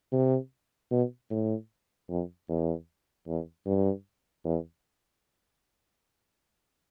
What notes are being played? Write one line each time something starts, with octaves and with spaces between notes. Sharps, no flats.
C3
B2
A2
F2
E2
E2
G2
E2